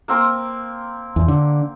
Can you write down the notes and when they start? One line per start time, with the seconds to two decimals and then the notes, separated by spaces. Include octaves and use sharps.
0.08 A#3 C4 A#4
1.16 E2
1.28 D3